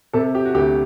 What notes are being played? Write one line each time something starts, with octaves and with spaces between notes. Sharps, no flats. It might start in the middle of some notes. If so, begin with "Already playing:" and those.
C3 A4
G4
F#4
D2 G4